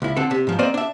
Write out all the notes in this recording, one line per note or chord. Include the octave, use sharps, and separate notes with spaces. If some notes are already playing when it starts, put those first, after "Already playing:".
C#2 E4
D3 C4 A4
C3
G#2 F3
A#3 C4 C5 D5 D#5
D4 E5